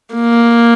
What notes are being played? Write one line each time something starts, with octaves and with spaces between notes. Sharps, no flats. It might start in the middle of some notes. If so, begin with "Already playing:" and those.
A#3